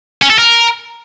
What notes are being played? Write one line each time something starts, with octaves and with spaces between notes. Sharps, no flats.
C#4
A4
A#4